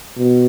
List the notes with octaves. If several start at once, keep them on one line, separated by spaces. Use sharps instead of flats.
B2